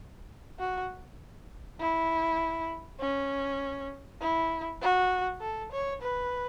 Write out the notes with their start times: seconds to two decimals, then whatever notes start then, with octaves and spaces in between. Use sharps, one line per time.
0.59 F#4
1.80 E4
2.99 C#4
4.20 E4
4.81 F#4
5.40 A4
5.71 C#5
6.01 B4